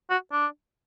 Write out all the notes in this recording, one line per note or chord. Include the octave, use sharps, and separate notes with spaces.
F#4
D4